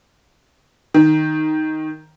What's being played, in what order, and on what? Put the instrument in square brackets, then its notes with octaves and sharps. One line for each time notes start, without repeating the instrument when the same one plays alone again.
[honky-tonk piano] D#3